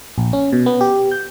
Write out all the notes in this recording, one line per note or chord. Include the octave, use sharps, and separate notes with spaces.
A#1
C#4
B2
B3
G4
G6